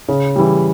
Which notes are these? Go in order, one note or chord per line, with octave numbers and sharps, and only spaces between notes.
C#3
E3 G3